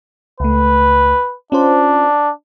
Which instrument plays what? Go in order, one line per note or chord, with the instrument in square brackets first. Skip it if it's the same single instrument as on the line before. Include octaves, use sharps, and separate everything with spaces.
[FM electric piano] C#2 A3 [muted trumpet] B4
[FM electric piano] C#4 F4 C5 [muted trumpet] D4